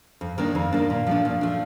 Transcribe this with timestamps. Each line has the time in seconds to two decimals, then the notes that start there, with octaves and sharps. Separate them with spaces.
0.21 F2
0.38 D#3 A#3 D4
0.55 F2
0.73 D#3 A#3 D4
0.90 A#2
1.07 F3 A3 D4
1.25 A#2
1.41 F3 A3 D4